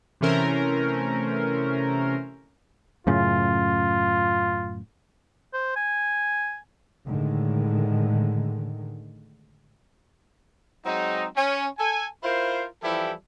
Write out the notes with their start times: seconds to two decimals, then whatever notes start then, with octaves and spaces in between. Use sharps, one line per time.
0.21 C3 E3 A3 C#4 A#4 C5
3.07 F#2 A2 C#3 F4
5.54 C5
5.76 G#5
7.06 A2 D3 D#3 G#3
10.86 F#3 G#3 C4 D#4
11.37 C#4
11.78 A4 G#5
12.24 E4 F4 A#4 C5
12.83 E3 F3 G3 E4 G4 A4